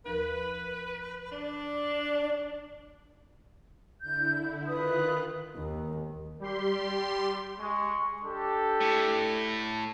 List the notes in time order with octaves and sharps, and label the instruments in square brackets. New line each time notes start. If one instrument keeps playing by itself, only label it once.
[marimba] D#2 F3 A#4 [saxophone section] B4
[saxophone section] D4
[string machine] D3 E4 [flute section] G6
[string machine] D#3 F4 F#6 [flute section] B4 D#6
[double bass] D#2
[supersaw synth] G3 G4 C6
[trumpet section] G#3 C#6
D4 G4 A4
[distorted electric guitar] A2